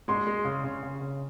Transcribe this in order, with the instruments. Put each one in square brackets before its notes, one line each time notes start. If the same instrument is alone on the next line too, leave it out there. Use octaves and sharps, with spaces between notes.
[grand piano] G#3 [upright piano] C6
[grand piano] G#3
C#3
C#3
C#3
C#3